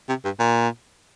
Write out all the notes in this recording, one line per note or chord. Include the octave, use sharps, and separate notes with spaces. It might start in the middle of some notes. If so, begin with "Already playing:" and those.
C3
G2
A#2